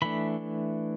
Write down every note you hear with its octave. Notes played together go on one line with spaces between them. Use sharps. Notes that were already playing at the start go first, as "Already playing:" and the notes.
E3 A3 D4 B5